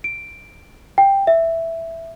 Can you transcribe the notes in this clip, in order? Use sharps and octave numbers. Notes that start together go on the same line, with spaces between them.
D7
G5
E5